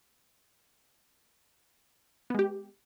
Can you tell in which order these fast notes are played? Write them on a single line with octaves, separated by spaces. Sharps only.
B3 G#3 G4